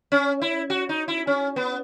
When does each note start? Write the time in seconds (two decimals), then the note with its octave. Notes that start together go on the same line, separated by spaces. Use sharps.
0.12 C#4
0.42 E4
0.70 F#4
0.89 D#4
1.08 E4
1.27 C#4
1.56 B3